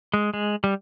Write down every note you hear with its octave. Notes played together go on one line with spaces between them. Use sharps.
G#3
G#3
G3